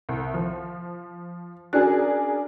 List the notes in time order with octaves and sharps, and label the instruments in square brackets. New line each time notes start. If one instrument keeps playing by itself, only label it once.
[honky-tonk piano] C2
F3
[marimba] C#4 F#4 F#6 [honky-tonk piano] D4 G#4 A#4